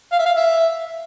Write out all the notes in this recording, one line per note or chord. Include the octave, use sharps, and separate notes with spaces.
F5
E5
F5
E5